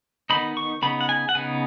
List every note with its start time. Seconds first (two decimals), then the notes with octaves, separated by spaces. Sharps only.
0.30 D#3 B3 D#4 B5
0.57 C#6
0.82 C#3 B3 D#4 B5
1.01 F#5
1.09 G#5
1.29 F#5
1.35 C#3 B3 D#4 G#5